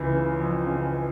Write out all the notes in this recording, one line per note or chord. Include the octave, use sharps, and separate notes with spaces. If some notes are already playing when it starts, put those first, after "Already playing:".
Already playing: C#2 E3
C#3
F2
C#3